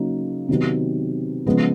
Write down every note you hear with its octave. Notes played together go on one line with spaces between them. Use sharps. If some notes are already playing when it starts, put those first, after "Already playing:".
Already playing: C#3 F#3 A#3 D#4
C3 D#3 F#3 B3 D#4
C#3 F3 G#3 B3